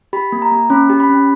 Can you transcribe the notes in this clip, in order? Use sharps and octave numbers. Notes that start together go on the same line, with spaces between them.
G4 B5
A#3
A#5
A#3
C#4 B5
G4
B5
C#4